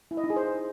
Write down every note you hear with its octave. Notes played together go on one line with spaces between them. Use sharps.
E4
D#5
D#4
G#4
C5